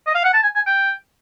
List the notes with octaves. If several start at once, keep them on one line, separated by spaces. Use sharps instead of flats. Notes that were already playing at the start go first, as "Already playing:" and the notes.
D#5
F5
F#5
A5
G#5
G#5
G5